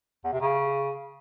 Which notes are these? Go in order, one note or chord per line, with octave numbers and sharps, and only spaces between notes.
E2
C3
C#3